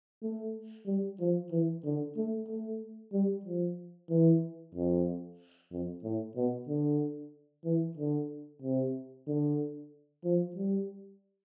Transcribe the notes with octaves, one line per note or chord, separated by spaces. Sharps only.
A3
G3
F3
E3
D3
A3
A3
G3
F3
E3
F2
F2
A2
B2
D3
E3
D3
C3
D3
F3
G3